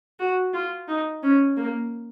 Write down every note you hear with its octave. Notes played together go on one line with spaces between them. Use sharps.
F#4
F4
D#4
C#4
A#3